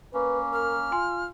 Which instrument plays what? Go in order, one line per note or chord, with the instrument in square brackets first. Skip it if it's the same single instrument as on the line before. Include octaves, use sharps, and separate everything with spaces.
[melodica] A#3 C#4 [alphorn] B4
[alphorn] A#4 [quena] F6
[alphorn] F4 [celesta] G#5 C6